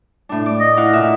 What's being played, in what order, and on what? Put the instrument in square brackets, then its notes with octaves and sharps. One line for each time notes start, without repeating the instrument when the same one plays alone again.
[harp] A2 D4
D5
[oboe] D#5
[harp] E4 F5 F#5
A#2 E5